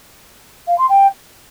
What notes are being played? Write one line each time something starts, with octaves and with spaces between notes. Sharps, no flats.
F5
C6
G5